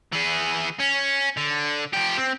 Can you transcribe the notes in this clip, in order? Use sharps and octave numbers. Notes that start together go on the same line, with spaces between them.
E3 G#4
C#4
D3
F3 G4
C4